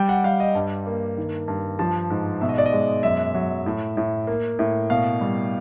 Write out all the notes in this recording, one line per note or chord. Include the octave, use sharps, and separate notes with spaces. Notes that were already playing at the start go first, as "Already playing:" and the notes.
Already playing: G3 G5
F#5
G3 F5
D#5
G2
A#3
D#3
G2
F3 A5
G#2
B2 E5
D#5
D5
D#5
G#3
F#2 E5
F#3
A2
A2
A#3
A2
B2 F5
G3